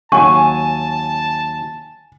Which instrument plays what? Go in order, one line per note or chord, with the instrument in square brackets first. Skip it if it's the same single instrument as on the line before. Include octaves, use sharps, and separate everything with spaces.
[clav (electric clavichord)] D#2 F#3 [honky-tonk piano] G#5 [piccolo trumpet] A5 [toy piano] C#6